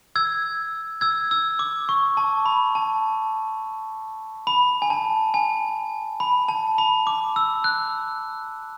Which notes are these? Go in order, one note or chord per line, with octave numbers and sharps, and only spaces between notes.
E6 G#6
E6 G#6
E6
D6
C#6
A5
B5
A5
B5
G#5
A5
G#5
B5
A5
B5
D6
E6
F#6